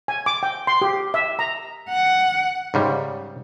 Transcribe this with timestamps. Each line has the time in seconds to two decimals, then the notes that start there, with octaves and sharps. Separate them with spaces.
0.08 G#5
0.26 D6
0.43 G5
0.67 C6
0.81 G4
1.14 E5
1.39 A#5
1.89 F#5
2.74 G#2 C#3 G3